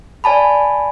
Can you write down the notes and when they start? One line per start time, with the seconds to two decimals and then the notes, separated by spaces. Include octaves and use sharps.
0.24 D5 G#5 A5 B5